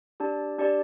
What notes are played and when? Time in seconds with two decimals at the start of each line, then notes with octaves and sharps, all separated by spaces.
0.20 D4 G4 D5 A5
0.59 D4 G4 D5 A5